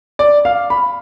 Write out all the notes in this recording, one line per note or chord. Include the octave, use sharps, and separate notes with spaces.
D5
F5
B5